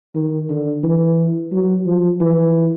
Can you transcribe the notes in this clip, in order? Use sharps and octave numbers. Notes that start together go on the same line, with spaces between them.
D#3
D3
E3
F#3
F3
E3